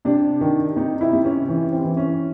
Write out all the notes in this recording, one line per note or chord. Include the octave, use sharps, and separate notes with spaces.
C3 D4
D#3
C3 D#4
E4
C3
C#4
E3 C#4
C4
E3
C#4